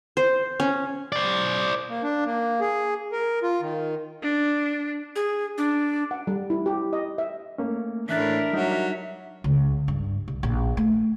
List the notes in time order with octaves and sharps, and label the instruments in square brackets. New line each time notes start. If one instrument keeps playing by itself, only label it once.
[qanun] C5
C#4
[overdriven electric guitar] C5 D5
[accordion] A#3
D4
A#3
G#4
A#4
F4
D#3
[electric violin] D4
[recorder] G#4
D4
[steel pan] F#5
G3
E4
G4
D#5
E5
[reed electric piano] A3 A#3 C#4
[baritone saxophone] A2 [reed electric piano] E3 F#6 A6 [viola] D4 A#4 [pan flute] E5
[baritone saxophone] F#3 [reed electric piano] G3 D#4
[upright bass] C#2
G2
C2
A#1
A3